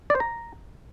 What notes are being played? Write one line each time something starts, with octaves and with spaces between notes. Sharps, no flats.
D5
C5
A#5